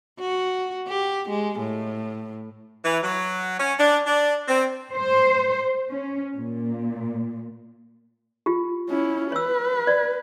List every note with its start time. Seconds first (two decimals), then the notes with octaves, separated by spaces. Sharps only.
0.20 F#4
0.88 G4
1.30 G#3
1.60 A2
2.85 E3
3.04 F#3
3.60 C#4
3.80 D4
4.07 D4
4.49 C4
4.94 C5
5.91 C#4
6.36 A#2
8.46 F4 G4
8.89 C#4 E4
9.32 B4 C#5 E6
9.87 D5